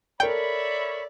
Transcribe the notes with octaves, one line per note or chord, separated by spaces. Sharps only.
A4 A#4 C#5 D5 E5 G5 B5